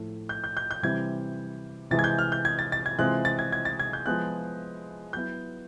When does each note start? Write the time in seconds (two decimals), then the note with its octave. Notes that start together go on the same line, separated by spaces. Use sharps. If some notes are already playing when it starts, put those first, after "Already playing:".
Already playing: A2 F3 A3
0.29 G6
0.44 G6
0.57 G6
0.71 G6
0.83 C3 E3 G3 C4 G#6
1.91 C3 E3 G#3 A6
1.99 G#6
2.04 G6
2.19 F6
2.32 G6
2.45 G#6
2.59 A6
2.72 A6
2.86 G#6
2.98 C3 E3 G#3 C4 F4 F#6
3.25 A6
3.39 G#6
3.52 G#6
3.65 A6
3.80 G#6
3.93 G6
4.06 F3 G#3 B3 E4 F#6
5.13 F#3 B3 E4 G6